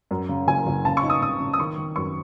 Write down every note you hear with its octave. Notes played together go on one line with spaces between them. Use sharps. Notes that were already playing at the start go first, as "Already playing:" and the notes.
F#2
C#3
F#1 G#5
F#1
C#3 A5
C#6
D#4
D#6
C#3 D#6
C#3
D#6
D#3 C#6
D#3
F#2 C#6